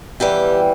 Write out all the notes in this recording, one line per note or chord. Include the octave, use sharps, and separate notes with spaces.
E2 E3 G3 G4